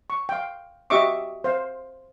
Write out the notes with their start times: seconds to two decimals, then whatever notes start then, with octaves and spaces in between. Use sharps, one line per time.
0.10 C#6
0.29 F5 G5
0.90 F#4 G4 D#5 E5 C#6 D6
1.44 C5 F5